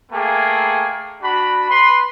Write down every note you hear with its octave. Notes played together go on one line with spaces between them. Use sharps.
A3 A#3 G#4 G5
D4 F#4 B5
B4 B5 C6